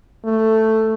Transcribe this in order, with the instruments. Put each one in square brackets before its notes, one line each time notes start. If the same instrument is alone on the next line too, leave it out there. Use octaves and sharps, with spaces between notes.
[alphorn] A3